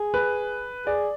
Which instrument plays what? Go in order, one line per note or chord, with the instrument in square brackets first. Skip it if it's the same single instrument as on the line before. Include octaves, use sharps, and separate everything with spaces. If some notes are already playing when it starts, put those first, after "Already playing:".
Already playing: [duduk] G#4
[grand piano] B4
[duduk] G#4 [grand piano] D5